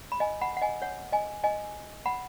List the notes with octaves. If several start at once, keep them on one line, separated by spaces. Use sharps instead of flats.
B5
D#5 G#5
F#5 B5
F#5
D#5 G#5
C#5 F#5
D#5 G#5
D#5 G#5
F#5 B5